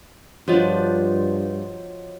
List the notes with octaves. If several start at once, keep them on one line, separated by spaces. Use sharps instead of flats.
G2 F3 D4 F#4 C#5 D#5